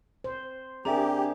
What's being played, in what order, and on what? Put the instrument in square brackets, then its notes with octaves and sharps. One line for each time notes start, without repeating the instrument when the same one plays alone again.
[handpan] C5
[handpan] C4 G#4 D5 [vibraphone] D4 [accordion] G4 [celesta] A#4 E5 A#5